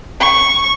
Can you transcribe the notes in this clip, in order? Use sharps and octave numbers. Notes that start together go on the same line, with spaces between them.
C#6